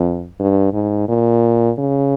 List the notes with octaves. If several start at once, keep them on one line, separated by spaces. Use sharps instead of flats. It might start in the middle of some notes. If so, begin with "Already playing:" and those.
Already playing: F2
G2
G#2
A#2
C#3